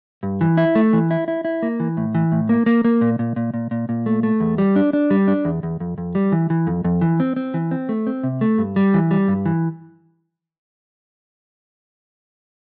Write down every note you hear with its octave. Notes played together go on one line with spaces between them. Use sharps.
G2
E3
E4
A3
E3
E4
E4
E4
A#3
E3
A2
E3
A2
A#3
A#3
A#3
A#2
A#2
A#2
A#2
A#2
A#2
A3
A3
E2
G3
D4
D4
G3
D4
E2
E2
F2
F2
G3
E3
E3
F2
F2
E3
C4
C4
E3
C4
A3
C4
C3
A3
G2
G3
E3
G3
G2
E3